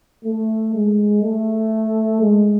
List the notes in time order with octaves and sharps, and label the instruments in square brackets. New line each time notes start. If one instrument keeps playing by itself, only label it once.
[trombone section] A3
G#3
A3
G#3